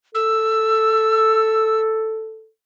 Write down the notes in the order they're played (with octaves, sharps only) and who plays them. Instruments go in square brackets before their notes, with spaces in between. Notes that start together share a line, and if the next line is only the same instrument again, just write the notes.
[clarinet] A4 [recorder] E6